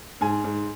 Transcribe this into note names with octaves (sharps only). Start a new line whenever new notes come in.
G#2 G#5
G#2